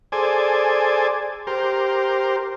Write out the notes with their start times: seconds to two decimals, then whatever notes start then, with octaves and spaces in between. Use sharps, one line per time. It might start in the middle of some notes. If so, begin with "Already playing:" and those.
0.12 G#4 A4 C5 D5 G#5
1.47 G4 A#4 C5